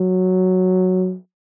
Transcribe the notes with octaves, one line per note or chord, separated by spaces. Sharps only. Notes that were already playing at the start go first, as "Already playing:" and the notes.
Already playing: F#3